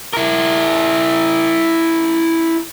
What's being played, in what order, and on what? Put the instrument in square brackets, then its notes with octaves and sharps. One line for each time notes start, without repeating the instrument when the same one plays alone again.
[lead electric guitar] E4 A#4